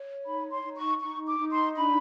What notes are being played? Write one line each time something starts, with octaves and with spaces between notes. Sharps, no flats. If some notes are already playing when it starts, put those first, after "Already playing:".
Already playing: C#5
D#4 B5
C6
D#4
C#6
D#4 C#6
D6
D#4
C6
D4 B5